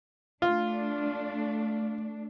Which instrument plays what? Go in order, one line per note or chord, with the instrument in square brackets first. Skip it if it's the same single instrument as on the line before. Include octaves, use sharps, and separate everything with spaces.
[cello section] A3 D4 [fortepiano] F4